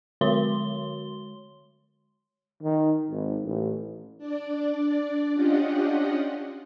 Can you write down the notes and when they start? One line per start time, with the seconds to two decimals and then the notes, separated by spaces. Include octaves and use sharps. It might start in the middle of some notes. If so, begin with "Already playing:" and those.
0.21 D3 G#3 F#4 C#5 C6 G7
2.63 D#3
3.10 G#1
3.44 A1
4.18 D4 D5
5.33 C#4 D4 F4 G4 D#5 F#5